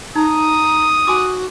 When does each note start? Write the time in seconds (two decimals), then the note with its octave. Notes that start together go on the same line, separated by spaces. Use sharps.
0.16 D#4 A#5 D#6
1.07 F#4 G#5 C6 D6